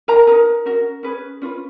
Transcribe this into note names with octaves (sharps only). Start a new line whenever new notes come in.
A#4 A#5
D#4 G#4 A#4 B4 A#5
C#4 F#4 A#4
C#4 G#4 B4
C#4 F4 B4